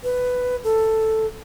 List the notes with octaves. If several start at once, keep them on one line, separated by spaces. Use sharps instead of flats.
B4
A4